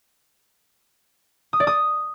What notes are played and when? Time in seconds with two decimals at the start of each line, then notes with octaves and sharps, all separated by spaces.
1.53 D#6
1.60 D5
1.67 D#6